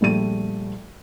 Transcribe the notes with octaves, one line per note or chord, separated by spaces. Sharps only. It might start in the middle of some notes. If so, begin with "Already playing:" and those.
A#1 G3 A3 D#7